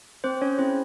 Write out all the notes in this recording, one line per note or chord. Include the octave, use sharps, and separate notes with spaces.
C4 C5
C#4 C#5
C4 E4 G#4 C5